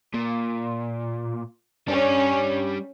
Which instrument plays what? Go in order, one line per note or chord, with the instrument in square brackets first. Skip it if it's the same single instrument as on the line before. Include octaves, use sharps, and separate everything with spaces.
[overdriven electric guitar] A#2
[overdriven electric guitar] G3 D4 [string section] C#4